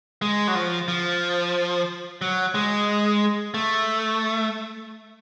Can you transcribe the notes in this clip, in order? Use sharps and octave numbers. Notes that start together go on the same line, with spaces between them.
G#3
F#3
F3
F3
F#3
G#3
A3